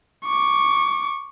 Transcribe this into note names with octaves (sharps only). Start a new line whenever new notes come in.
C#6 D6